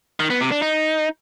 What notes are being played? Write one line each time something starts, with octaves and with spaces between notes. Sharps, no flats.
D#3
B3
C3
D4
D#4